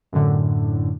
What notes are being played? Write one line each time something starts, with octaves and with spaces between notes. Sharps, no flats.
F#2 A2 D3